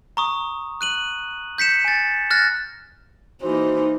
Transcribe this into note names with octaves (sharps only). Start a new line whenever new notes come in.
A#5 C#6 D#6
F#6 D#7 F#7
G6 B6 C#7 E7
G#5 A6
F6 F#6 A6 A#6
E3 A#3 D#4 F#4 C5